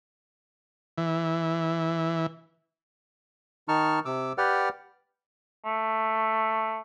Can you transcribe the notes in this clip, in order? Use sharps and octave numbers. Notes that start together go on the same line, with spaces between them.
E3
D#3 D#4 A5 C#6 F6
C3 D6 E6
G4 B4 D5 F#5 G5 F6
A3